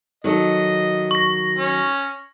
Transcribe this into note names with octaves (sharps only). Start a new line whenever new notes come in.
D#3 F#3 A4 D#5
C#6 A#6
C#4